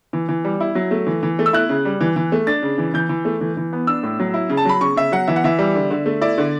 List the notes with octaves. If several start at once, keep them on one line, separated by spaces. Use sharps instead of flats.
E3
E3
G3
E4
F#3
A3
E3
E3
A3
E6
E4 F#6
C#3
G3
E3
E3
A3
D4 A6
C#3
E3
E3 G6
E3
A3
E3
E3
B3
D4 E6
A2
F#3
E4
C#3
A5
F#3 B5
C#3 C#6
C#3 E5
F#3 F#5
E3 E5
F#5
E3 E5
G3
D3
D3
A3
E4 D5
D3